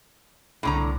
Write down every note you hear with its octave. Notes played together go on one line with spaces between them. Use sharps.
C2 A2 D3 A#5